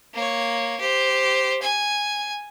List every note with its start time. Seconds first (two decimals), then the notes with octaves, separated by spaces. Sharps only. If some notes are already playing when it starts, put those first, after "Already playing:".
0.14 A#3 C#5
0.80 G4 C5
1.62 G#5